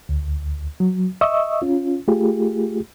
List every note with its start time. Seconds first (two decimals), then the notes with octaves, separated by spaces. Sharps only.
0.09 D2
0.80 F#3
1.21 D#5 E5 C#6 D#6 E6
1.62 C#4 F4
2.08 A3 F4 G4 G#4